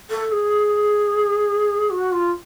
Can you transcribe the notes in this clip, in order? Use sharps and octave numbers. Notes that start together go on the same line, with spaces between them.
A4
G#4
F#4
F4